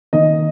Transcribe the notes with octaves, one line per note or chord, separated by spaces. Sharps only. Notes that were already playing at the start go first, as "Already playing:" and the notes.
D#3 A#3 D#4 D#5